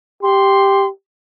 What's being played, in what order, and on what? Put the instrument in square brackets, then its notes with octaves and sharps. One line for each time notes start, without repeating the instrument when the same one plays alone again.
[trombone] G4 [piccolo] C6